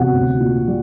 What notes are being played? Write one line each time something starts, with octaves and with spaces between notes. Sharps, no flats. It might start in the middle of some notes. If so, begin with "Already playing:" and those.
Already playing: E1 C3 F#4 F#5
D2
A#2
G3